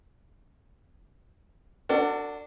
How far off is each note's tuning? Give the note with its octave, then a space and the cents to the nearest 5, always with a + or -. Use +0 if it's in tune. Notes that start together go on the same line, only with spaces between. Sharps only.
D4 +0 F#4 +0 A4 +45